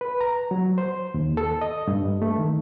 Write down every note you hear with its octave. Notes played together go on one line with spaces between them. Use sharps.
B4
A#5
F#3
C5
D#2
A4
D#5
G2
A3
D#3